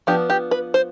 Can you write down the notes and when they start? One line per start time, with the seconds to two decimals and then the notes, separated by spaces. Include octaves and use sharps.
0.07 F3 B3 D4 G4
0.30 G4
0.51 B4
0.74 C5